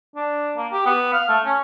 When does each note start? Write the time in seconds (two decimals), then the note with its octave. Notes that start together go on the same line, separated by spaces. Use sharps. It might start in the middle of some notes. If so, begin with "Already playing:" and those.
0.15 D4
0.57 A#3
0.72 G4
0.86 B3
1.13 F5
1.29 A3
1.45 C#4